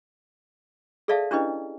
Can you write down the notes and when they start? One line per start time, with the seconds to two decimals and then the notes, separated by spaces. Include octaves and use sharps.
1.08 G#4 A4 D5 E5 F5 A5
1.31 C#4 D4 E4 G4 B4 D#5